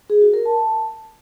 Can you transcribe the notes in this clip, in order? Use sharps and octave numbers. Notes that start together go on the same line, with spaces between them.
G#4
F#4
A#4
A5